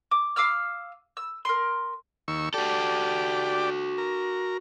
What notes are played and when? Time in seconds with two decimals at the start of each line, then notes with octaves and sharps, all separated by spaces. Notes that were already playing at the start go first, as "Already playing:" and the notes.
0.11 D6
0.36 F5 D6 E6 F6
1.17 E6
1.45 A#4 C6
2.28 D#2 C#6 E6
2.54 F#4 G4 A4 D5
3.98 A#4